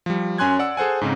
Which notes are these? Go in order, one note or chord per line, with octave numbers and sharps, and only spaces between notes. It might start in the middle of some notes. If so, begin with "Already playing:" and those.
F3 G3
F#2 C#4 G#5 C6 F#6 G#6
D5 F#5 E6
G#4 A4 C5 F#5 G#5
G#2 C#3 C4 D#4